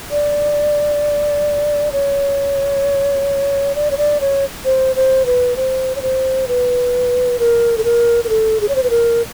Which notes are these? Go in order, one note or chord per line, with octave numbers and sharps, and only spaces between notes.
D5
C#5
D5
C#5
D5
C#5
C5
C5
B4
C5
C#5
C5
B4
A#4
A4
A#4
A#4
A4
G#4
C#5
C5
B4
A#4